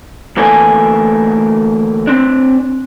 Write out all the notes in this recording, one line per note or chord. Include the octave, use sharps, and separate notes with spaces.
D2 E3 A3 A#3 D4 G#5
C4 D4